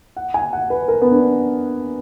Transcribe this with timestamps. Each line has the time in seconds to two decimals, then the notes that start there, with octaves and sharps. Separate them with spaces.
0.16 F#5
0.34 G#5
0.53 F#5
0.70 B4
0.88 A#4
1.02 B3
1.11 D4